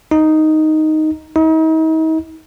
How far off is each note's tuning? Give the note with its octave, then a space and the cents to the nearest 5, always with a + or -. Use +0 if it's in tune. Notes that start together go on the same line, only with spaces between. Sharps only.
D#4 +0
D#4 +40